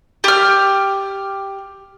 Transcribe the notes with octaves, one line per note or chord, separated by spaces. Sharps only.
G4 F6